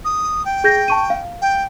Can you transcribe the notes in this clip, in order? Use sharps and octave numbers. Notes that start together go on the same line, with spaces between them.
D#6
G5
G#4 G6 A#6
A5 C#6 D#7
F5
G5